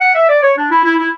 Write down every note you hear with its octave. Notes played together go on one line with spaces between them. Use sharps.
F#5
E5
D5
C#5
D4
E4
E4
E4